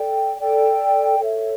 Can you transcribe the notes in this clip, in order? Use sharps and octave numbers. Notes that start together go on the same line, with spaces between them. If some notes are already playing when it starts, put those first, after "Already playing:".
Already playing: A4 D5 G5
A4 D5 G5
A4 C#5 E5